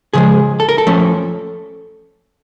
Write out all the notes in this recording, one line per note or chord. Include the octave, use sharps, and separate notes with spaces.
C#3 F3 G#3 G#4
A4
A#4
A4
F3 A3 C#4